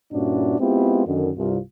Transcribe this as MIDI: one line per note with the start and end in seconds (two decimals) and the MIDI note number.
0.13 0.56 43
0.13 0.56 46
0.13 0.56 61
0.13 0.56 62
0.13 0.56 64
0.13 0.56 66
0.58 1.03 56
0.58 1.03 59
0.58 1.03 60
0.58 1.03 64
0.58 1.03 65
0.58 1.03 67
1.05 1.29 42
1.05 1.29 50
1.05 1.29 51
1.36 1.57 36
1.36 1.57 43
1.36 1.57 65